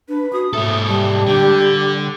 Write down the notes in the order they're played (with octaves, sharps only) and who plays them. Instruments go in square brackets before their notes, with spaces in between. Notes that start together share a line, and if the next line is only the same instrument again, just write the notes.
[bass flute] D4 [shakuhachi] B4
[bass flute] F#4 [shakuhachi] D#6
[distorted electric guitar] G#2 A4 [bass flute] E5
[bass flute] G3 [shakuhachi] A5
[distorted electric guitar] D3 [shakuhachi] G4